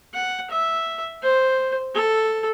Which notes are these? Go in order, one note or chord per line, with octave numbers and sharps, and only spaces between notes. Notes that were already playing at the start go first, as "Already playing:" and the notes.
F#5
E5
C5
A4